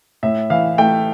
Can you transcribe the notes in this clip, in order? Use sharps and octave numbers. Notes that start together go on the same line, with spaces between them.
A2 E5
E3 F5
A3 G5